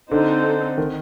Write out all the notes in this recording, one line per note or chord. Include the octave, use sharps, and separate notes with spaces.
D3 C4 D#4 A4 C5
D#3